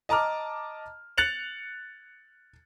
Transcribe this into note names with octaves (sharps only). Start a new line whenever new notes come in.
D#5 A5 A#5 D6 F6
F#6 A6 C#7 F7 F#7